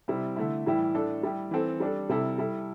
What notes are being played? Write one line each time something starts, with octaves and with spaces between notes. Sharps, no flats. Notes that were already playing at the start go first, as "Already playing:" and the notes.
C3 G3 C4 E4
D3 A3 E4
A2 E3 G3 E4 G4
A2 A3 D4 A4
G3 E4 G4
E3 C4 A4
G3 D4 A4
C3 G3 E4 A4
G3 E4 A4